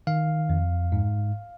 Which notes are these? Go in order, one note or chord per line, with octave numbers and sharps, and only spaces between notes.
D#3 F5
F2
G#2